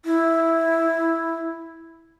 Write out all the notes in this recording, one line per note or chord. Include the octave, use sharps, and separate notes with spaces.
E4